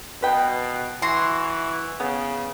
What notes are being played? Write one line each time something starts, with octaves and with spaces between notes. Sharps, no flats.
B2 B4 G5
E3 F#4 C6
C#3 B3